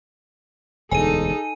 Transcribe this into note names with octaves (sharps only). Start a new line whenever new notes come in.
E1 D2 D#4 G#4 A4 G#5 D#7